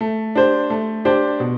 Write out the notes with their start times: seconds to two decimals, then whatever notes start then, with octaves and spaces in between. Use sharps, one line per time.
0.01 A3
0.35 D4 G4 C5
0.70 A3
1.05 D4 G4 C5
1.40 B2